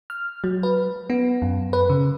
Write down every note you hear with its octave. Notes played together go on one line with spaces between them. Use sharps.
F6
F#3
B4
B3
F#2
B4
C#3